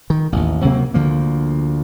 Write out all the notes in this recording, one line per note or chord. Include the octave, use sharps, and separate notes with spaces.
D#3
A1 D#2
C3 F#3 A#3 C4
D2 D3 F3 A#3